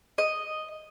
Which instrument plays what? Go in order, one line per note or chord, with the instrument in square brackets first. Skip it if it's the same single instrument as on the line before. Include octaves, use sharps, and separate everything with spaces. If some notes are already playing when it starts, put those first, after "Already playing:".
[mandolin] D#5